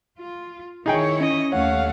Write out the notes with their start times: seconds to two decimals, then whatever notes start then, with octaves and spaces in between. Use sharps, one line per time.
0.18 F4
0.86 D#3 D#4 E4 G#4 C#5 G5
1.21 C#4 D#5
1.52 D#2 A3 C#4 C#5 F5 F#5